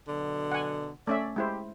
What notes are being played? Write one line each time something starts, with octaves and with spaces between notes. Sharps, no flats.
B2 D3 F#3
F#5 G#5
A3 C#4 D5 E5
G#3 E4 G4 C5